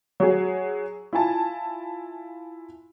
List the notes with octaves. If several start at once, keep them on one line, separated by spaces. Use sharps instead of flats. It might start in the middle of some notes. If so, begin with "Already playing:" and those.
F#3 F#4 G#4
E4 F4 G#5 A5